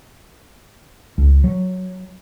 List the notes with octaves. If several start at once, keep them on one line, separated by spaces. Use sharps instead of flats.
C#2
F#3